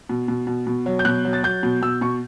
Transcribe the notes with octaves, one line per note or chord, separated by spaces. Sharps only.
B2
B2
B2
B2
F#3
G6
B2 F#6
F#3
A6
F#3 G6
B2
B2 E6
B2 C#6